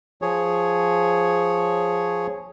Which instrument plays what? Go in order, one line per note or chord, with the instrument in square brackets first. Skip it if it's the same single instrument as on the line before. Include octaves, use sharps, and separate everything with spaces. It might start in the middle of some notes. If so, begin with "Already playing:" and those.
[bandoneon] F3 G#4 C#5